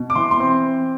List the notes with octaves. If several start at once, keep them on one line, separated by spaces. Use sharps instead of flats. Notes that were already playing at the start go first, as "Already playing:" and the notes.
Already playing: B2
D6
E3 C6
C6
C4